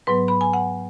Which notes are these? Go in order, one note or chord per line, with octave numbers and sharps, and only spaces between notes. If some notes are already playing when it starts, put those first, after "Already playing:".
G#2 F#3 B3 B4
B5
G#5
F#5